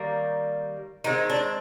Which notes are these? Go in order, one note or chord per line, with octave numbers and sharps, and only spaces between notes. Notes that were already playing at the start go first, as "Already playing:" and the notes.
Already playing: D#3 G3 A#3
D#3 G#3 C4 D#4
D4